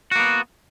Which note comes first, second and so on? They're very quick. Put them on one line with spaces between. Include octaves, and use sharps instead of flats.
F#4 A#3 B3